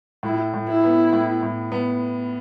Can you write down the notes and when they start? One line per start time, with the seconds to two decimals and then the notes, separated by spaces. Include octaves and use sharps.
0.23 A2 E4
0.54 A2
0.68 E4
0.84 B3
1.13 A2
1.43 A2
1.72 B3